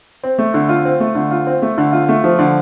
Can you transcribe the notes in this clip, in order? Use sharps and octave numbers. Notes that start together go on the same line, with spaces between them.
C4
A3
D3
F4
C4
A3
D3
F4
C4
A3
D3
F4
A3
F3
D3